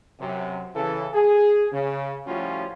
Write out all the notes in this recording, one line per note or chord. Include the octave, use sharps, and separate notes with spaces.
F#2 C3
C#3 E3 A4
G#4
C#3
A2 F3 G3 C#4 F4 F#4